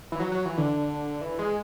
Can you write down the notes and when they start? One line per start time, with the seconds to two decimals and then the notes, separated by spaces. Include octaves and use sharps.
0.12 E3
0.20 F#3
0.32 F#3
0.45 E3
0.57 D3
1.21 E3
1.39 G#3